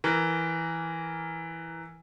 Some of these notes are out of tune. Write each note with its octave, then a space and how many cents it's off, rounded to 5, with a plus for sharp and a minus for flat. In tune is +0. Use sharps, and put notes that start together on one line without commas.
E3 +0 A#4 +0